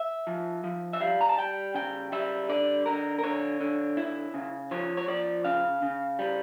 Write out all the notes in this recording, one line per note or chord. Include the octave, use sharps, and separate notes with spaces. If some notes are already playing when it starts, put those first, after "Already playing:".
Already playing: E5
F3
F3
E5
G3 F5
A#5
A5
G3 G5
C#3 G5
G3 E5
D3 D5
D3 A#4
A#4
D3 C#5
D3
E4
C#3
F3 C#5
C#5
F3 D5
C#3 F5
C#3
G3